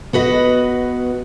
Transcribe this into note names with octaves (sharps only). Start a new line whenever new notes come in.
B3 F#4 B4 D#5